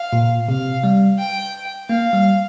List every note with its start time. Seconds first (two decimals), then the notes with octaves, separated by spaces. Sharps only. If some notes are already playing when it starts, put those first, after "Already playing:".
Already playing: F5
0.13 A#2
0.48 C3 F5
0.84 G3
1.18 G5
1.89 A#3 F5
2.13 G3